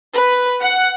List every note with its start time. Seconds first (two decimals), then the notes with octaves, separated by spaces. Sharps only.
0.15 B4
0.61 F#5